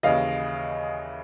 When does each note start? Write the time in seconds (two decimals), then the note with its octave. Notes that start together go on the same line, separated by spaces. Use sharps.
0.03 D#2 C#3 E3 D#5 F5